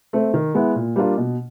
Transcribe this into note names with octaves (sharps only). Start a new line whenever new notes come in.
A3 C4
D#3
G#3 B3 E4
A#2
G3 A#3 D4 F4
B2